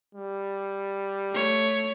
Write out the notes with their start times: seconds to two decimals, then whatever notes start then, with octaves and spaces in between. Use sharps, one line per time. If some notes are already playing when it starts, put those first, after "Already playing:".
0.15 G3
1.32 A3 C#5